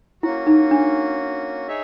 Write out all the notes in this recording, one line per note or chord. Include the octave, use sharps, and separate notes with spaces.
A#3 C#4 E4 F#4
D#4
D4
D#4 G#4 C#5 E5